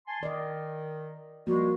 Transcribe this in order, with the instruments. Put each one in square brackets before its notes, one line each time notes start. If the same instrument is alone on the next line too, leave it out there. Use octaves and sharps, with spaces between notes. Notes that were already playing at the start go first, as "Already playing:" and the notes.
[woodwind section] G#5 A5 C6
[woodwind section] D#3 [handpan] D5 D#5
[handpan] F3 A#3 [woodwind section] G3 G#3 [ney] F#4